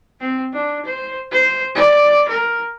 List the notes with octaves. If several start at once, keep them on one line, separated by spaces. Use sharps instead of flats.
C4
D4
C5
C5
D5
A#4